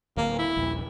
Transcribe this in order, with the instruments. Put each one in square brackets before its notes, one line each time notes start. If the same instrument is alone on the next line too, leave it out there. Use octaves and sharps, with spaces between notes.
[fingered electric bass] D1 [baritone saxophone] A#3
[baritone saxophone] E4
[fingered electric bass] D#1 A#1